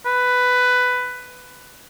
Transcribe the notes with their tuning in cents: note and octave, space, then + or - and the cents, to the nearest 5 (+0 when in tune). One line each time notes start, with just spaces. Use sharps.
B4 +10